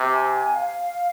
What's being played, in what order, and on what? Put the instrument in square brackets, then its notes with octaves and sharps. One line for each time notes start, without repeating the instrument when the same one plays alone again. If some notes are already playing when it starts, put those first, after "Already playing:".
Already playing: [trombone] C3
[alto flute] G#5
F5